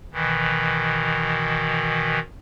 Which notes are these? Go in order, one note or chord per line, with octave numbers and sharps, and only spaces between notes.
B2 D#3 E3